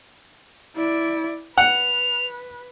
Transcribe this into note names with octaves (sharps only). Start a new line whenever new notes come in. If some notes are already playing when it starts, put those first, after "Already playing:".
E4 D5
B4 F#5 F7